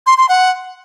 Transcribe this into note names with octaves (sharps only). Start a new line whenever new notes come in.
C6
C6
F#5